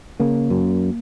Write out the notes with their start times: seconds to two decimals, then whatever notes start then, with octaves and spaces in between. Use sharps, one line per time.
0.20 C#3 A#3
0.50 F#2